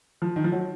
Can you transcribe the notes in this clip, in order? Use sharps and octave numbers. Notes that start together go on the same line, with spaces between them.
F3
D#3
F3
F#3